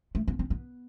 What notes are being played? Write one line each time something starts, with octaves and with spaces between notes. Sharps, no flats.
A3
B3
C4
B3